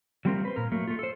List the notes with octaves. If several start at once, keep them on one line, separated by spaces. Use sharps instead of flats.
F#3 G3 A3 C4 F4 A#4
B4 C5
A#2 A#4
F#3 A3 A#3
A3 F4
A4 C5